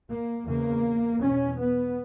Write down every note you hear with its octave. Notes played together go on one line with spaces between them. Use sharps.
A#3
E2 C#3 A#3
E2 B2 C#4
B3